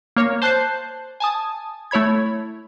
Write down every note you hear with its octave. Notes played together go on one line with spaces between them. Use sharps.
A#3 C#5
C5 A5 F#6 G6 C7
G#5 A5 D#6
A3 E4 C#5 B5 G#6